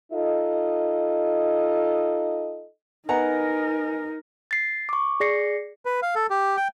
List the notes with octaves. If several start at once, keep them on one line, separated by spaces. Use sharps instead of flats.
D#4 F4 A4 D#5
B3 D#4 A#4 D#5 F#5 G#5 A#5
A6 C7
C#6 D6
G#4 D5 A#6 C7 C#7
B4
F5
A4
G4
G5